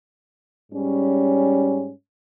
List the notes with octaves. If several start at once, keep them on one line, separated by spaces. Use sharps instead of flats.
G#2 G3 C#4